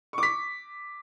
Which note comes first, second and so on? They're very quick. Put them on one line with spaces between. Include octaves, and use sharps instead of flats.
C#6 D6 B6